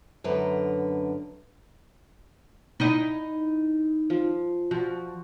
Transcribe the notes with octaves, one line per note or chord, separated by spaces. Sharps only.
F#2 D3 A#4 B4
D#4 E4 D#5
F3
F3 F#4